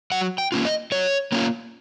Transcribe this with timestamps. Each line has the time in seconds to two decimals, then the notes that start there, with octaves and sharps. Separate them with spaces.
0.12 F#3 F#5
0.38 G5
0.52 A#3 C#4 F4
0.65 D#5
0.92 F#3 C#5
1.32 A#3 C#4 F4